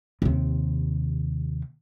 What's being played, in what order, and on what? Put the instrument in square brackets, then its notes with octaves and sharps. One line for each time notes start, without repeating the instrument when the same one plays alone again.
[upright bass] D#2 C3